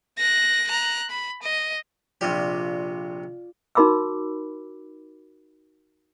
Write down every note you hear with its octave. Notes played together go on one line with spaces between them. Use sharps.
F#6 A#6
A#5 F#6
B5
D#5
A#1 C3 F4 G4 D5
D#4 F#4 A#4 B5 D6 E6